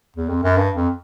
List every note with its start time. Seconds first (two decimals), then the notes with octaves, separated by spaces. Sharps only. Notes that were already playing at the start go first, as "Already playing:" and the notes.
0.16 E2
0.29 F2
0.43 F#2
0.57 G2
0.76 F2